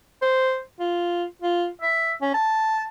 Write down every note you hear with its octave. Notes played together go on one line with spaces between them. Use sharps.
C5
F4
F4
E5
C#4
A5